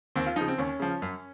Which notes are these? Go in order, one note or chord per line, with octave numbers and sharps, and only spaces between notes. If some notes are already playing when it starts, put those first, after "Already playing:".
D#2 C4
F4
C#3 F3 D#4
C4
D#2 C#4
C#3 F3
F#2